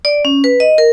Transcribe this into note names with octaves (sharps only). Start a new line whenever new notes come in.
D5
C#4
B4
D#5
A#4